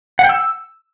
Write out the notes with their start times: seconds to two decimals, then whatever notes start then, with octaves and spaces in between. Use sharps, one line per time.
0.19 F#5
0.24 G5
0.29 E6